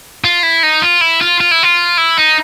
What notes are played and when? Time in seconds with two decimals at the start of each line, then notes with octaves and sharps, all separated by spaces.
0.24 F4
0.43 E4
0.63 D#4
0.82 F4
1.01 E4
1.21 F4
1.40 F4
1.51 E4
1.63 F4
1.98 E4
2.17 D#4